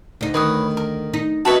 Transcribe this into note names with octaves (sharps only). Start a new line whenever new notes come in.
D2 D#4
D#3 B4 C#5 D#6
A#4
D#4
F#4 B4 C#5 D#5 E5 A5